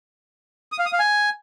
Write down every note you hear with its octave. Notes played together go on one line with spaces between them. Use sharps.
D#6
F5
D#6
F5
G#5